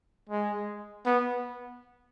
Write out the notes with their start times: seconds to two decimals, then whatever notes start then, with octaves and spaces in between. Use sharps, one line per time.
0.29 G#3
1.06 B3